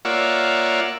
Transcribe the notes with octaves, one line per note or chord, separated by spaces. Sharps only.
A#3 F4 C#5 D5 E5 F#5